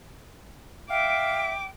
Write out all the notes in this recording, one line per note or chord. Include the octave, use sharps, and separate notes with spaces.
E5 F5 G5 D6